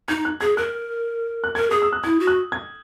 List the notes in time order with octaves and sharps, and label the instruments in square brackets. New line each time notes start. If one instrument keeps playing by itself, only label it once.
[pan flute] D#4 [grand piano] G#6
[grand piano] F#6
[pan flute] G#4 [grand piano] G#6
[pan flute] A#4 [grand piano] F#6
[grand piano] F#6
[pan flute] A#4 [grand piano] G#6
[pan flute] G#4 [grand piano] D#6
[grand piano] E6
F#6
[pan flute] E4 [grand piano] G#6
[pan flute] F#4
[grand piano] F#6
G#6